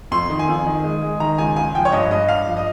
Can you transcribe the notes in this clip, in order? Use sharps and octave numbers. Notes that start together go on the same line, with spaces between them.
F2 C6
D#3
G#5
F2
D#3
G#3
G#3
D#3 A#5
C#2 G#5
C#2 G#5
F3 G5
C#5
G2 D#5
G2 D#5
G2 F5
F3
D#5